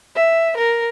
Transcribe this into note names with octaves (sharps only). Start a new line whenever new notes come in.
E5
A#4